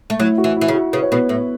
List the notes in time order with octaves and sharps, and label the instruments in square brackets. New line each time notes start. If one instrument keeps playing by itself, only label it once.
[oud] A3
[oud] F#3 [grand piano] E4
[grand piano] F#4
[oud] E3
[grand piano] E4
[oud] E3
C#3
[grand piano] F#4
[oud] C#3 [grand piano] B4
[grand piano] C#5
[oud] B2 [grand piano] B3 B4
[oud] A2